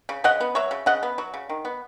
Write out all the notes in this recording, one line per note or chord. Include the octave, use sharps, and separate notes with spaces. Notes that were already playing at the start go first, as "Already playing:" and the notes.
C#3
C#3 D#5 F#5
B3
F#3 C#5 E5
C#3
C#3 D#5 F#5
B3
F#3
C#3
D#3
B3